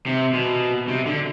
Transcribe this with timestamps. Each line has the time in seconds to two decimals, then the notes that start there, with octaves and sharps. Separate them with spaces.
0.06 C3
0.34 B2
0.88 C3
1.06 D3